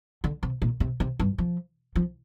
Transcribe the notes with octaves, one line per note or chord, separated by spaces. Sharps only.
D3
C3
A#2
C3
C3
G2
F3
F3